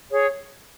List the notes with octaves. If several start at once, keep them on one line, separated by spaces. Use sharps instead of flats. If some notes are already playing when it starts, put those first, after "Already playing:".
G#4 C#5